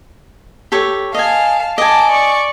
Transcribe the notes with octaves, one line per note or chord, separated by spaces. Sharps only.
G4 A4 C#5
D#5 F5 G#5 A5
D#5 G#5 A5 D6
D5 C#6